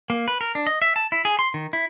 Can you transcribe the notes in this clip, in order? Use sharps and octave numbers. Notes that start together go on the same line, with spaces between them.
A#3
B4
A#4
D4
D#5
E5
A5
E4
G#4
C6
D#3
E4